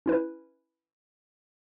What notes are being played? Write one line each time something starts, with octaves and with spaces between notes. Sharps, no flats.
C#4 E4 B4